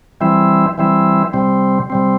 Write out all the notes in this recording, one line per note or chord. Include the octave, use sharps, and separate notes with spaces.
E3 G3 C4 E4
E3 G3 C4 E4
C3 G3 C4
C3 G3 C4